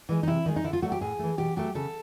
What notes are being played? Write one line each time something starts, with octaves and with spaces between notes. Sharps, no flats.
E3 G#3
D#4
C3 E4
D#3 G#3 D#4
D#4
D3 E4
F4
F#3 A3 F#4
G4
A2 G#4
E3 A3
B2 G4
F#3 A3 G4
C#3 A4